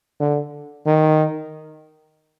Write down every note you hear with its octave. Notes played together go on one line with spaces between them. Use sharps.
D3
D#3